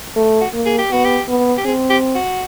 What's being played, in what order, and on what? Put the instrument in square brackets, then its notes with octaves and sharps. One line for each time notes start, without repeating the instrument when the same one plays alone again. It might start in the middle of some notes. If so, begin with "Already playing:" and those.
[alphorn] A3
[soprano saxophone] F#4
[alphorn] A#3
[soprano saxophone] G#4
G4
[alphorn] B3 [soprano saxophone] F#4
[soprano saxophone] G4
[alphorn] B3
[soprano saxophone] G4
[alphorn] C4 [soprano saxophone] G#4
[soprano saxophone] G4
F#4